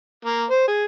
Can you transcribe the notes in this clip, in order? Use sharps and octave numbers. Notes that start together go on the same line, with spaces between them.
A#3
C5
G#4